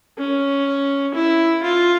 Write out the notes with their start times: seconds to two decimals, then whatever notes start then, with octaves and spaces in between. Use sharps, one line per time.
0.18 C#4
1.15 E4
1.63 F4